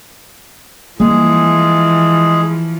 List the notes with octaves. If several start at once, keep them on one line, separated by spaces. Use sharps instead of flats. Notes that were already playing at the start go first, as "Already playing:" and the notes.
E3 F3 G3 G#3 A#3 G#4